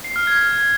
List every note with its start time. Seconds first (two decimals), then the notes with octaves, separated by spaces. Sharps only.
0.04 C7
0.16 F6
0.27 G#6